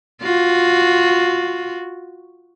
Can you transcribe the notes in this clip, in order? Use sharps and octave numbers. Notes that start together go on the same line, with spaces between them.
F4 F#4